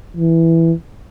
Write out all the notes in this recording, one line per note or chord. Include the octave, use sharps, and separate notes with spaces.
E3